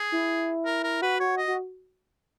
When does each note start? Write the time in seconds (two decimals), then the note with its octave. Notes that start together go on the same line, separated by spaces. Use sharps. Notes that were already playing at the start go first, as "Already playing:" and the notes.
Already playing: G#4
0.12 E4
0.66 A#4
0.84 A#4
1.02 F#4 B4
1.20 F#4 C#5
1.38 D#5
1.47 F#4